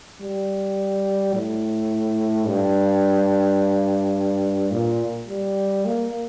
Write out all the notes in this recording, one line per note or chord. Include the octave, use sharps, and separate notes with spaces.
G3
A2
G2
A#2
G3
A#3